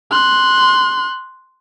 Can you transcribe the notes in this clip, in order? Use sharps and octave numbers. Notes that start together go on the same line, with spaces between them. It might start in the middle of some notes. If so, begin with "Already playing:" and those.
C6 F#6